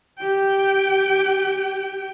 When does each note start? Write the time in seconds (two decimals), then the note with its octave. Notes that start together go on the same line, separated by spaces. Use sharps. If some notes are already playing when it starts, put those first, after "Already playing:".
0.19 G4 G5